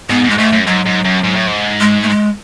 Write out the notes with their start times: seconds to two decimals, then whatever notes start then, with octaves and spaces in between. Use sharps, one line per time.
0.09 G#2 B3
0.24 G#2
0.30 G#3
0.38 G#2 A3
0.53 F#2
0.67 G#2 F#3
0.86 G#2
1.05 F#2
1.24 G#2
1.35 A2
1.47 G#2
1.80 G#3
2.02 A3
2.09 G#3